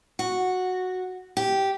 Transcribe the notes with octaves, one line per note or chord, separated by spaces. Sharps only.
F#4
G4